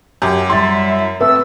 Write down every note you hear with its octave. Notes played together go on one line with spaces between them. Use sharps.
F#2 G4 G#5
G3 E4 E5 C6 A6
A3 B3 C4 A4 E5 E6